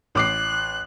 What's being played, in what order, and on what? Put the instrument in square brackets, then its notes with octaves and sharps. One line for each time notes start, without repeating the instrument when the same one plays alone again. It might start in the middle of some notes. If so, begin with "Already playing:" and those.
[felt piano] A1 D6 C7 [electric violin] F#6